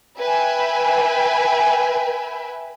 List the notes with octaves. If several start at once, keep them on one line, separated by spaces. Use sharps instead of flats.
B4 E5 G5 G#5